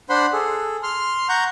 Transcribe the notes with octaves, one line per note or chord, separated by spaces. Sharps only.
D4 C5 F#5 B5 C6
G#4 A4
C6 F6
F#5 A#5 C#6 G6